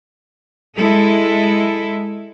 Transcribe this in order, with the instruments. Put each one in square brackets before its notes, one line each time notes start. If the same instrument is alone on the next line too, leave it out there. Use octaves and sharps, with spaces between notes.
[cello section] G#3 E4 A4